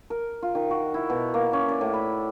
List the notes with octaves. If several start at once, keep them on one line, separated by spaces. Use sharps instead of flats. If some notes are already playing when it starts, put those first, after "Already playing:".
A#4
F4
D#3
F#4
E4
B2
A#3
C#4
D5
A2
B5